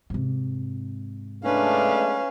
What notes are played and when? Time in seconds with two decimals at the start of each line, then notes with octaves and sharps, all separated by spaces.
0.10 G#2 C3
1.44 G#3 A3 C#4 D4 B4 F5